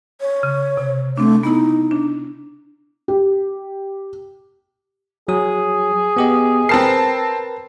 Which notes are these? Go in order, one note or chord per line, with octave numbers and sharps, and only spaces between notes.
C#5
C#3
C3
A3 C4 D4
B3 D#4 E4
D4
G4
F#3 G#4 D#6
B3 G4 D#5
C4 A#4 B4 A5 C7